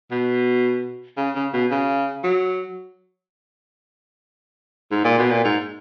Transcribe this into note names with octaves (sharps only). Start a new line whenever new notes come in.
B2
C#3
C#3
B2
C#3
F#3
G#2
A#2
B2
A#2
G#2